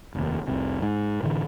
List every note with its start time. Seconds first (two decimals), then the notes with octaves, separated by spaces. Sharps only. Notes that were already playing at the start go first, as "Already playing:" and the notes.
0.15 F1 D#2
0.48 F1 C2 C3
0.82 G#2
1.23 A2 D3 E3